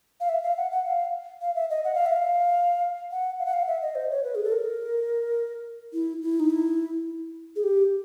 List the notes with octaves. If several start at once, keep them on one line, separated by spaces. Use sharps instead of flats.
F5
E5
F5
F#5
F#5
F5
F5
E5
D#5
F#5
F5
E5
F5
F#5
F5
F#5
F5
E5
D#5
C5
C#5
B4
G#4
A4
A#4
E4
E4
D#4
E4
G#4
G4